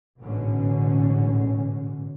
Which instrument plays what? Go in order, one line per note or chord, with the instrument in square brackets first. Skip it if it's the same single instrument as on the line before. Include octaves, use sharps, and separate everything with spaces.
[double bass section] A1 G#2 B2 D3 C#4